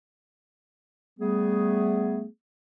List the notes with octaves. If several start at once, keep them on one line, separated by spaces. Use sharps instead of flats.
G3 A3 B3 G#4